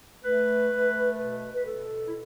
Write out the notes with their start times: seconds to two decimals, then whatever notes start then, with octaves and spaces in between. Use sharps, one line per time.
0.24 A3 B4
0.72 A3
1.19 B2 B4
1.55 B4
1.66 B2 A4
2.08 E4